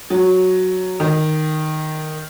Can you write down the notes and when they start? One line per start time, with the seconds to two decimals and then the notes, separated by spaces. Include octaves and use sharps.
0.10 F#3
1.00 D#3